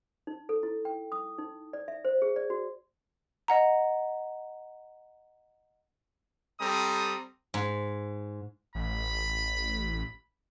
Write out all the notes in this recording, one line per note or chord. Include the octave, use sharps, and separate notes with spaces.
D#4
A4
E4
G5
D#6
D#4
D5
E5
C5
G#4
D5
F#4
D#5 F#5 A#5
G3 C4 A4 A#5 D#6
G#2
A1 B5